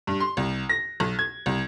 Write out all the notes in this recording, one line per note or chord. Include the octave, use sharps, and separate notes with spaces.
G2
C6
C2
A#6
B1
G#6
C2